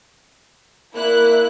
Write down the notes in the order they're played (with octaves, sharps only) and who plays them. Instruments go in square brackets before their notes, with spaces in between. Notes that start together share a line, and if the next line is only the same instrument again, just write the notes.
[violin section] A#3 E4 F#6 [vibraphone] A#4 D5